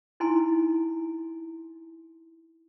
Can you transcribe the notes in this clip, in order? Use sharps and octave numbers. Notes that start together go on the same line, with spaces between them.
D#4 E4 G#5 C6